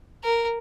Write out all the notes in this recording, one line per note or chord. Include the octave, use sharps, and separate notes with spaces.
A#4